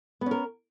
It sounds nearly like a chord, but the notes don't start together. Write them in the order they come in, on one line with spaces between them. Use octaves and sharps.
B3 C#4 A#4